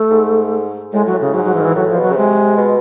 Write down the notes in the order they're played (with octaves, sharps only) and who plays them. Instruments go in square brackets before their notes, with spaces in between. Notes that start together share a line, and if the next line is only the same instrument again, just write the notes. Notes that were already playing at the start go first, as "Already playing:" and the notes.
Already playing: [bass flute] A3
[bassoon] G#2
[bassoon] A2 [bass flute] G#3
[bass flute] F#3
[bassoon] A2
[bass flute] C#3
[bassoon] G#2 [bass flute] F#3
[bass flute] F#3
E3
D#3
E3
[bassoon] A2 [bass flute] F#3
[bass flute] F3
[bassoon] B2
[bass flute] F#3
[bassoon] C#3
[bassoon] C3 [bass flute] G#3
[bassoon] B2